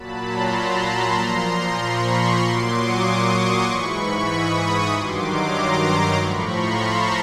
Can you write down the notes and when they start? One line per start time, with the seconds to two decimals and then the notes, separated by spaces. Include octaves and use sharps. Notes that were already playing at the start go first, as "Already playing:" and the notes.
Already playing: A#2 F#3 A5 B5
0.23 A#5 C6
0.54 A5 B5
1.16 A#2 F3 A#5 C6
1.79 B5 C#6
2.41 A#2 F#3 C6 D6
2.72 C#6 D#6
3.03 C#6 D#6
3.35 C6 D6
3.66 G#2 E3 B5 C#6
4.28 C#6 D#6
4.90 G2 D#3 F#3 C6 D6
5.21 A#5 C6
6.15 A2 F3 B5 C#6
6.46 A#5 C6
6.78 A5 B5